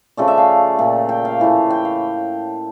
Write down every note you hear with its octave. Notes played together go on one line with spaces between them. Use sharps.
C#3 F3 A3 D5
E5
F5
A#2 A3
G5
F5
A2 E3 A3
G5
F5